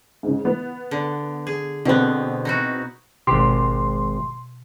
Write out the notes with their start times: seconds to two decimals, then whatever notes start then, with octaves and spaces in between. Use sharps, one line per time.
0.23 G#2 C#3
0.45 B3
0.91 D3
1.47 G#4
1.85 B2 D3 B3 C4
2.45 D#4 E4 F#4
3.27 G#1 B2 G4 C6